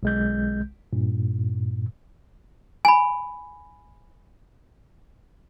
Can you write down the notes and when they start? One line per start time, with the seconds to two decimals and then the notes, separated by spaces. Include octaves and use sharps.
0.03 B1 G#3 G6
0.93 G2 A#2
2.85 G#5 B5